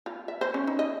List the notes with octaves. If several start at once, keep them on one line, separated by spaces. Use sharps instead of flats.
F4
E5
C5
C#4
D#4
D#5